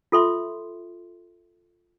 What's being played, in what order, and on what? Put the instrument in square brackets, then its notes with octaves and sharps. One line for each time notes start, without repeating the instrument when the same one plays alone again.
[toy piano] F4 A4 E5 C6 C#6